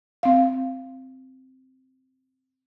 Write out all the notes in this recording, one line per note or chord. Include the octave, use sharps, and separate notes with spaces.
C4 F5